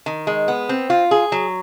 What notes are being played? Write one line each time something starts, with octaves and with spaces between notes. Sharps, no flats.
D#3
G#3
B3
C4
F4
G#4
F#3